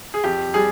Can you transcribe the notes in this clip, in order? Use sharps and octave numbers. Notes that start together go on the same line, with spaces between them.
G#4
F2 G4
G3 G#4